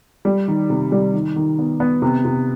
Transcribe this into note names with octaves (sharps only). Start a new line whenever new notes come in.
G3
D#3
C3
G3
D#3
D#3
B3
B3
C3
C3